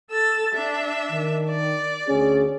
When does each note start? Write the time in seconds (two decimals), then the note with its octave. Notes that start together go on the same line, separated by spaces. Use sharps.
0.10 A4 E6 A6
0.55 D4 E5
1.12 D#3
1.50 D5
2.08 D2 C#4 G#4